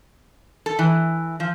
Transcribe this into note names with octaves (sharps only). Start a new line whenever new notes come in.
A4
E3
F3